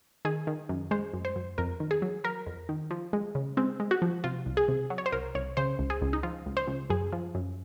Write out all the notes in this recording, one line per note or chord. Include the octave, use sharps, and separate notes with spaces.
D#3 G#4
D#3
F#2
G#3 C5
F#2
C5
F#2
F2 A#4
D#3
G#4
F#3
F#3 A#4
F2
D#3
F3
G#3
C#3
G#3 C4
G#3
F#4
F3
C3 F4
C2
G#4
C3
F#3
C#5
C5
C2 A#4
C2 C#5
C#3 C5
C#2
G#4
C#2
D#4
F3 F4
C#2
C5
C#2
F#2 G#4
F3
F#2